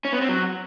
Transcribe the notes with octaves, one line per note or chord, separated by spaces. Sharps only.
C#4
B3
C4
F#3